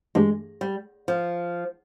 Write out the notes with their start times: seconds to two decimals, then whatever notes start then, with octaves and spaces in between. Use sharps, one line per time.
0.15 G2 E3 G#3 A3 D4 G4
0.61 G3
1.08 F3